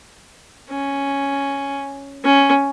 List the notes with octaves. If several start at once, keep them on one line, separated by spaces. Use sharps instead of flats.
C#4
C#4